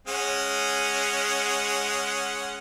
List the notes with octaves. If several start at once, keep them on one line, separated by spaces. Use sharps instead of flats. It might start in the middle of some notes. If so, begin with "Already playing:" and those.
G#3 C#4 F#5